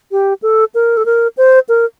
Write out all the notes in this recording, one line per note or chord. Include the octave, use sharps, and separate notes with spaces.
G4
A4
A#4
A4
A#4
C5
A#4